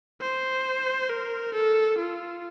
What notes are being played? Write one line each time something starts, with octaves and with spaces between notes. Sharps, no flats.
C5
A#4
A4
F4